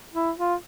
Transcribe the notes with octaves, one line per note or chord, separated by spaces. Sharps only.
E4
F4